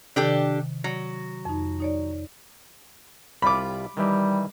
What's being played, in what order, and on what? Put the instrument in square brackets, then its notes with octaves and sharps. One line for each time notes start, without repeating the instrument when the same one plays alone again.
[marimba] C3 D#3 [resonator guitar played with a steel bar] D4 G4 A4
[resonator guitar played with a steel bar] F#3
[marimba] F2 D#4
D#4 C#5 D5
[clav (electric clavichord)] C2 G3 F4 [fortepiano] B5 D6
[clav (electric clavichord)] D#3 E3 G4 [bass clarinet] G3